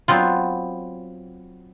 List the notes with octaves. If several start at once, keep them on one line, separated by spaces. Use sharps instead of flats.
F#3 B3 C4 F4